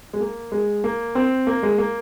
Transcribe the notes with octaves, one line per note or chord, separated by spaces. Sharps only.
G#3
A#3
G#3
A#3
C4
A#3
G#3
A#3